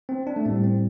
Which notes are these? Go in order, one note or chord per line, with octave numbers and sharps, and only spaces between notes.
C4
D4
A3
A2 G3 C4
C4